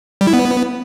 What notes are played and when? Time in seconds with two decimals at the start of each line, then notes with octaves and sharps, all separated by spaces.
0.21 G3
0.27 E4
0.33 B3